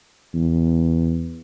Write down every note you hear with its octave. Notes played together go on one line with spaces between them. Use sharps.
E2